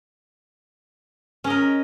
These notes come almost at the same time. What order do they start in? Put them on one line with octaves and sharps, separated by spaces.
C#4 D#5 A#4